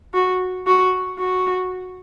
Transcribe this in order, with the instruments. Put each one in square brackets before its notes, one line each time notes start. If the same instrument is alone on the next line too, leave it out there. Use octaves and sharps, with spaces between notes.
[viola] F#4
F#4
F#4